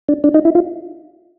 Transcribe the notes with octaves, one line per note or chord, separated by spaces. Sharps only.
D4
D4
D#4
E4
F4